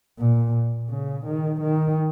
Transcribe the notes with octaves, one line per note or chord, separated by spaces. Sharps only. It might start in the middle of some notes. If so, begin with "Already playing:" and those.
A#2
C#3
D#3
D#3